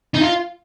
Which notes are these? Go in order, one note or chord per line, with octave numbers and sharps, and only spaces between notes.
D#4
F4